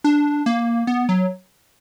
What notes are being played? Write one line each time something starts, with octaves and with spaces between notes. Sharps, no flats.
D4
A#3
B3
F#3